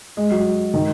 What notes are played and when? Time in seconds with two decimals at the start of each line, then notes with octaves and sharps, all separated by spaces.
0.17 G#3
0.31 F#3
0.74 D#3